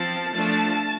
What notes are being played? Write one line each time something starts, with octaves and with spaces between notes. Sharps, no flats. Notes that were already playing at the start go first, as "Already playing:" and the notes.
Already playing: F3 C4 A5
F3 A3 D4